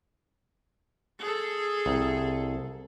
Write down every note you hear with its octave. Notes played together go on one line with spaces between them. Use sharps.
G#4 A4
C2